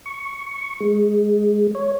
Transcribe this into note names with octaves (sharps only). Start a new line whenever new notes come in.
C#6
G#3
C#5